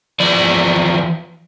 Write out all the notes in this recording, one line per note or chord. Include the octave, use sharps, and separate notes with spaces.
E3 F3 D5